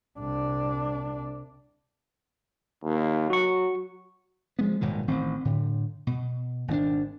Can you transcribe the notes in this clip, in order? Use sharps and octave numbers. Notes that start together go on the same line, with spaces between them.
C2 D4
D#2
F#3 F#4 C#6
F3 G#3 B3
D#1 G#2 B2 D#3
A1 D#3 C4
A2 D3
B2
G#1 D#3 C#4 D4